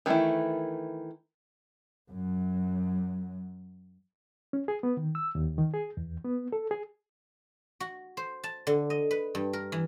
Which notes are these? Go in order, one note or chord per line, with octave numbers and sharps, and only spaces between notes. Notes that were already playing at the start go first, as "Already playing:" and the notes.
D#3 E3 G#3 A3 E4
F#2 F#3
C#4
G#4
B3
D#3
E6
D#2
D#3
G#4
E2
B3
A4
G#4
F#4
C5
A5
D3
D#5
B4
G2
A#4
E3